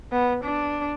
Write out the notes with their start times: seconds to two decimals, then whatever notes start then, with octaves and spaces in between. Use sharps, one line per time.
0.12 B3
0.44 D4